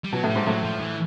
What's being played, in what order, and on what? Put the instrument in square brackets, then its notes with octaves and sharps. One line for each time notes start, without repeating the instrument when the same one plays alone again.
[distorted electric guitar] G3
[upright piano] B2 [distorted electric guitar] F#3
[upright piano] A2
[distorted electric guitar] G3
[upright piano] G#2
[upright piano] A2 [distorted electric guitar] F#3
[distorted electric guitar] F3
E3